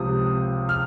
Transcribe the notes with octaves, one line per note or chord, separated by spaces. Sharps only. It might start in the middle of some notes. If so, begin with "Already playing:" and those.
Already playing: C#2 C3 F3 D#6
F6